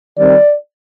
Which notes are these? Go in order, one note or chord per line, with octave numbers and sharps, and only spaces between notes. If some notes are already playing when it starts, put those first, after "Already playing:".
D#3 G3 C4 D5